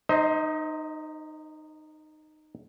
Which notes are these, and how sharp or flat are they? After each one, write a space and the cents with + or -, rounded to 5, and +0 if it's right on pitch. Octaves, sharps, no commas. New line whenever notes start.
D#4 -15 C5 +0 D#5 +30